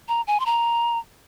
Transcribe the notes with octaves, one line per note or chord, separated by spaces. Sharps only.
A#5
G#5
C6
A#5